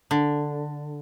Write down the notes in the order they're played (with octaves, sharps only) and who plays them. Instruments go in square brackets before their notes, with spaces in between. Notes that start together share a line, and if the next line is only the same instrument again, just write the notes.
[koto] D3